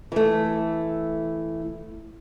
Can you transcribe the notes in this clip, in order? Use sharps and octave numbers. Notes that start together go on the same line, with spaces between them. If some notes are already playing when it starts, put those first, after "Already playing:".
E3 A3